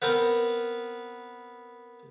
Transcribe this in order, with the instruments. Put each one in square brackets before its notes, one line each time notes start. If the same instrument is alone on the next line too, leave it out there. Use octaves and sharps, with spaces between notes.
[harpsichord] B3 C4 A#4 B4